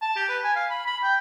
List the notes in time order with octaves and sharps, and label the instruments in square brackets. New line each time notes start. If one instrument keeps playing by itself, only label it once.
[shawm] A5
G4
B4
G#5
F5
B5
B5
G5